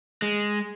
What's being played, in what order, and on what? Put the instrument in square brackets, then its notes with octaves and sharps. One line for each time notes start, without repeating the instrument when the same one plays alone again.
[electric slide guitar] G#3